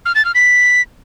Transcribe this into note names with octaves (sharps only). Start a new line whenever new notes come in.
F6
A6
F6
B6